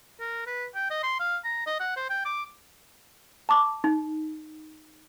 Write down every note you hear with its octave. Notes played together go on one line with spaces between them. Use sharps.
A#4
B4
G5
D#5
C6
F5
A#5
D#5
F#5
C5
G5
D6
A5 C#6 D6
D#4